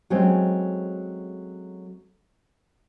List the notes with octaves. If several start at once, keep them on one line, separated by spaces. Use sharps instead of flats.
F#3 G#3 A3 C4 C#4